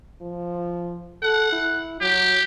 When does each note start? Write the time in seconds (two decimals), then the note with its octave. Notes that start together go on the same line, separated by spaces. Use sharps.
0.21 F3
1.23 A4 F#5
1.52 E4
2.01 F#3 G4